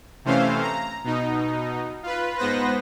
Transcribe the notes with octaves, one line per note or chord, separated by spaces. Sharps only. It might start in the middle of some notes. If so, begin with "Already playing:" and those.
C3 E3 A3 C#4 C5 F5
A#5
B2 D#4
F4 B4
G#2 B3 B4 C5 A#6